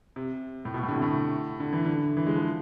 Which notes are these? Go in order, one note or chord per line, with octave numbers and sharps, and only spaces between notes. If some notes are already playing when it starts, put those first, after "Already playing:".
C3
A2
B2
A2
D3
C3
A2
D3
E3
D3
E3
G#3
F3